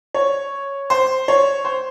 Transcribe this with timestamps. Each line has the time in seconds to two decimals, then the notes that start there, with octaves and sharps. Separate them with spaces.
0.14 C#5
0.90 C5
1.28 C#5
1.65 C5